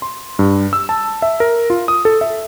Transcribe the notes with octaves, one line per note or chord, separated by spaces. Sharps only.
C6
G2
E6
A5
E5
A#4
F4
D#6
A4
E5